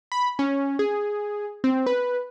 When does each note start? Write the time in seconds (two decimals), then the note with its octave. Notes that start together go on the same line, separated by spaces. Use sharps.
0.12 B5
0.39 C#4
0.79 G#4
1.64 C4
1.87 B4